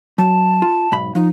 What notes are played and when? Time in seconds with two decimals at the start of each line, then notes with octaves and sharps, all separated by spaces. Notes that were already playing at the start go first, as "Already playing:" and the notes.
0.18 F#3 A5
0.62 F4
0.92 B1 G#2 B5
1.15 F3 D#4